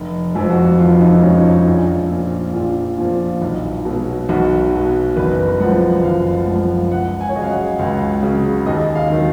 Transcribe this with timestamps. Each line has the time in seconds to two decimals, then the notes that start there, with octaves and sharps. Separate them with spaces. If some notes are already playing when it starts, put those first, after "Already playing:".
Already playing: F1
0.35 F2 F3
0.50 F#4
0.79 F1 F4
1.01 D#4
1.23 F2 C#4
1.27 F3
1.45 D#4
1.66 A#1 F4
2.10 A#2 F3
2.54 A#1 F4
2.98 A#2 F3
3.42 B1
3.85 B2 F#3
4.29 B1 F#4
4.72 B2 F#3
5.17 F#1 B4
5.60 F#2 F3 F#5
6.04 F#1 F5
6.48 F#2 F3
6.91 C#2 F#5
7.21 G#5
7.29 C#5
7.35 C#3 D#5
7.39 F#3 F5
7.50 F#5
7.79 C#2 F5
8.23 C#3 F#3
8.66 D#2 D#5
8.95 F5
9.10 D#3 F#3